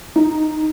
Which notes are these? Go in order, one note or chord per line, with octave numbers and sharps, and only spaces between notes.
D#4